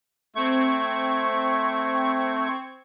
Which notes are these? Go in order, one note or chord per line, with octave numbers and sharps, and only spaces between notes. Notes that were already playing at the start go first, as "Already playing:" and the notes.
A3 C4 C#6 G#6